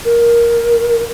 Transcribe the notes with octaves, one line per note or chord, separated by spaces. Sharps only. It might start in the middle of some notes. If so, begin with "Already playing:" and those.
A#4